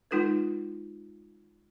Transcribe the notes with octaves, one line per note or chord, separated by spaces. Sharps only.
G#3 D#4 F4 A4 B4